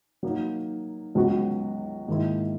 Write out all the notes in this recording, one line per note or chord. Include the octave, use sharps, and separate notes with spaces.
F#3 A#3 D#4
C#2 C#3 F#3 B3 F#4
G#2 D#3 A#3 E4